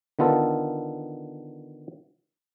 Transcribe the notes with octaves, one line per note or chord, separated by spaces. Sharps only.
D3 D#3 B3 F4 A4